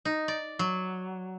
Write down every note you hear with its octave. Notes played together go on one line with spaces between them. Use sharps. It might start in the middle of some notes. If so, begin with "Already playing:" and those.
D#4
D5
F#3